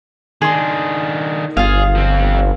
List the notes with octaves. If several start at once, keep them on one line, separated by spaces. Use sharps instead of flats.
D#3 D4 G#4 C6
G1 F4 G#4 F5
F3 C4